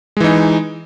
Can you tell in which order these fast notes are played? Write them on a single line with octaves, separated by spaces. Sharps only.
G#3 E3 D#4